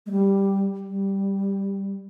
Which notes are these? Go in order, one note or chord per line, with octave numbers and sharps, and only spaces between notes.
G#3
G3
G3